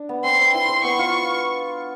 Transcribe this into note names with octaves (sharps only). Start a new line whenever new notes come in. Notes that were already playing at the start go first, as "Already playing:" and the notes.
Already playing: D4
B3
C4 C6
C4
E4 C6
C5
B3 C#6
F4